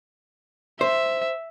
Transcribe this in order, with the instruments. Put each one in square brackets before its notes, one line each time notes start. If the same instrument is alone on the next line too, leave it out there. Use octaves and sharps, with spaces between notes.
[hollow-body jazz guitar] C5 [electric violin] E5